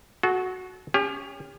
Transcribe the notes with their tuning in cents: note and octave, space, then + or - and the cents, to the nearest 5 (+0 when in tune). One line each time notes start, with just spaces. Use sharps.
F#4 +0 A4 -40
C#4 +20 G4 +40